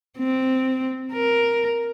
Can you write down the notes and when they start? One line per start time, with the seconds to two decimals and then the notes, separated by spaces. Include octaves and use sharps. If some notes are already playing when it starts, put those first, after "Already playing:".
0.18 C4
1.13 A#4